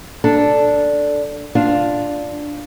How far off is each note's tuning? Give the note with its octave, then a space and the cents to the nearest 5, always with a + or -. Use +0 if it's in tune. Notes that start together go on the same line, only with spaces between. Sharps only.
D4 -5 A4 +0
D4 +0 F4 +0